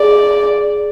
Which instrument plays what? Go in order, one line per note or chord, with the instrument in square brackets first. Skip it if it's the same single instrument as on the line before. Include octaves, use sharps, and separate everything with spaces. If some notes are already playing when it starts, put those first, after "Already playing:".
Already playing: [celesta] G#4 [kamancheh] D5